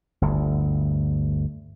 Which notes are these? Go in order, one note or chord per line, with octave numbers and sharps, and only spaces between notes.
G1 D2